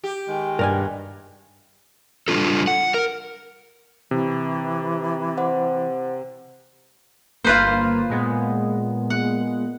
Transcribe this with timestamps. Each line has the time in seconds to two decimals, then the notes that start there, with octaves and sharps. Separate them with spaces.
0.04 G4
0.28 D#3 G#3
0.59 G2 A#4 D5 G#5
2.28 G3 D4 F4 A4
2.67 F#5
2.94 A#4
4.11 C3 E3
5.37 C5 F#5
7.44 G1 A#3 F4 B4 C5
8.10 A#2 G#3 B3
9.10 F#5